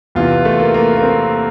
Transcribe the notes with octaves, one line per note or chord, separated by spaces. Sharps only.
E2 C3 E3 F4
A3
A#3
A#3
A#3
C4